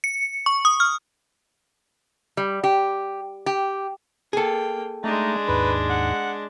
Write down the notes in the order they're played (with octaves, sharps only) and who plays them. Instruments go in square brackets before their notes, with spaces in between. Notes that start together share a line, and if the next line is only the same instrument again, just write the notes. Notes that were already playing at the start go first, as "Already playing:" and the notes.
[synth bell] C#7
C#6
D#6
F6
[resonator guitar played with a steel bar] G3
G4
G4
[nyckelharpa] A#3 G5 [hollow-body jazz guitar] G#4 A4
[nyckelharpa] G#3 D4 [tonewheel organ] A3 [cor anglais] D#4
[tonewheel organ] D#2 G#2 [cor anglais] B4
[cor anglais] F#5